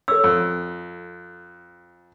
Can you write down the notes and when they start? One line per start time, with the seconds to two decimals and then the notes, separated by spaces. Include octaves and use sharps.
0.08 A4 C#5 E6
0.24 F2